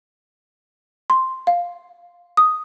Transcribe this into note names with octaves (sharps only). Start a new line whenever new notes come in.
C6
F5
D#6